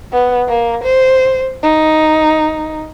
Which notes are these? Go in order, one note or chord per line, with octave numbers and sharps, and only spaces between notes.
B3
A#3
C5
D#4